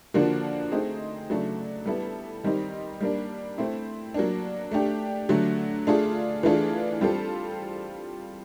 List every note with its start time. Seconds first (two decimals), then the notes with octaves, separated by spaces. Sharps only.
0.14 D3 F3 A#3 D4 F#4
0.71 A3 C4 D#4 G#4
1.29 C#3 F#3 A3 D4
1.85 G3 B3 E4 A4
2.44 D#3 G3 C4 D#4
3.01 G3 A#3 D4
3.58 A3 C4 E4
4.14 F#3 A#3 D4
4.72 A3 D4 G4
5.29 D3 F#3 A3
5.87 A3 D4 F4 G#4
6.43 E3 A3 D4 F4 G#4
7.01 G3 C4 F4 A4